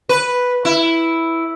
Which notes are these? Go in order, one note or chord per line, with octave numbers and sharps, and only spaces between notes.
B4
E4